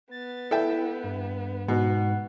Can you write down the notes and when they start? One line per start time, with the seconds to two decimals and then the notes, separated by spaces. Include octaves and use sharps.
0.11 B3 A6
0.51 E4 A4 E5 G5
1.03 G2
1.68 G#2 B2 F#5